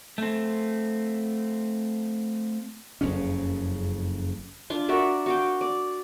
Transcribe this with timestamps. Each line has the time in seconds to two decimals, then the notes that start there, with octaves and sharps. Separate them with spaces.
0.18 A3 C4
3.01 F#1 F2 C#3 C#4
4.70 D4 F4
4.88 F#4 A#4 D5 E5
5.26 F#4 F5 G5
5.61 D5